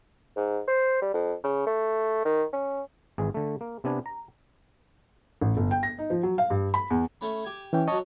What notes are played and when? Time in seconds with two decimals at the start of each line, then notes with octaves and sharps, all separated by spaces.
0.36 G#2
0.67 C5
1.01 G3
1.13 F2
1.43 C#3
1.66 A3
2.25 D#3
2.53 C#4
3.18 G#1 E3 G#4
3.34 D3 A3
3.61 A#3
3.84 C3 B3 D4 G#5
4.06 A#5
5.41 A1
5.57 G1
5.71 G5
5.83 A#6
5.99 D#4
6.10 F3
6.23 F#3
6.38 F5
6.50 G2
6.74 B5
6.90 E2
7.21 A3 C#4 B5
7.44 G4 G#5
7.73 E3 C#4 G5
7.88 F#3 C#4 D#5 A5 C#6